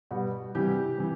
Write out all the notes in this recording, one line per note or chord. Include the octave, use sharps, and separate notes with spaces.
B2 G3 B3 F#4
C3 E3 G3 G4
C3 E3